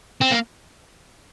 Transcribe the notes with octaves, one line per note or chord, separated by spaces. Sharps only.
C4
A#3